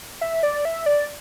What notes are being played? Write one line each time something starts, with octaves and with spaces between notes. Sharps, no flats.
E5
D5
E5
D5